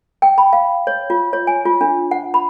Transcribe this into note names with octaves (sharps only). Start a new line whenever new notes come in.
G5
B5
F5
C#5
F4
C#5
G#5
F4
D4
F#5
B5